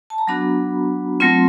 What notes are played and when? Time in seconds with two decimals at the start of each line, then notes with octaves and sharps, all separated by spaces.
0.10 A5
0.18 A#5
0.28 F#3 B3 D4 F#4 B5
1.20 F#3 A3 C4 F4 C6